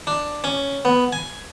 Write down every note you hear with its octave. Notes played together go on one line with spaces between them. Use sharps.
D4
C#4
B3
G#5